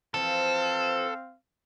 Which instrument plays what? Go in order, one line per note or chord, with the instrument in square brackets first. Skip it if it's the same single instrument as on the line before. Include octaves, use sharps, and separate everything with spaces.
[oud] E3 F3 [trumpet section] C4 F5 [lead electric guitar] A4